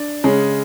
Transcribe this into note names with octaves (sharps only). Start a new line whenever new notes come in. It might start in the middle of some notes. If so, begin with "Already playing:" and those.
Already playing: D4
C#3 G#3 C#4